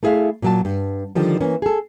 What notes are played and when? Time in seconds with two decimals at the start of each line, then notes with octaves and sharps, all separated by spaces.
0.03 A3 E4 G#4 E5 F5
0.42 A#2 F#3 A5
0.65 G2
1.15 D3 D#3 F3 G3
1.40 E3 A#3 C#4
1.62 G#4 A4